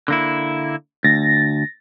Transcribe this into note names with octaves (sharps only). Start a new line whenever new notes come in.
D3 A#3 E4
D2 A6 A#6